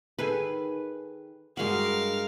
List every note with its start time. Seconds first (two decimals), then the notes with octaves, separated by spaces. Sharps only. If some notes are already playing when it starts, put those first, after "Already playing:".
0.19 D#3 G#4 A4 B4 G#5
1.57 G2 G#3 A#3 F#4 A#4 F5 B5